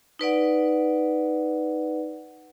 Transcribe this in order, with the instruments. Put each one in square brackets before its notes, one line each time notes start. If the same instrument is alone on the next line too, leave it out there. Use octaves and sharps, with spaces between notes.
[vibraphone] D#4 B4 D5 F#5